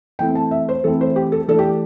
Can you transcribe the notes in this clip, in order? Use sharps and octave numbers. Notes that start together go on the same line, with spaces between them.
E3 A3 C4 E4 G5
A5
E5
C5
E3 A3 C4 E4 A4
C5
G4
A4
E3 A3 D4 A4
G4